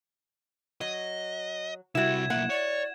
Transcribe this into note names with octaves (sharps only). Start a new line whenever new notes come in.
F#3 D#5
C2 G3 E4 F#4 E5 G#6 E7
B1 A#3 F#5
C#5 D5